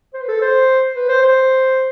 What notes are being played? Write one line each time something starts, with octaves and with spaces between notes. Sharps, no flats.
C5
B4
A4
C5
B4
C5
C5